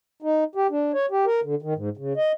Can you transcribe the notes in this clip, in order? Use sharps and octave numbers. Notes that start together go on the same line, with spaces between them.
D#4
G4
D4
C#5
G4
A#4
D3
D#3
G#2
C#3
D#5